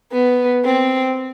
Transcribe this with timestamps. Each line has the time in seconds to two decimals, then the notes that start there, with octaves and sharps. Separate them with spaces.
0.12 B3
0.64 C4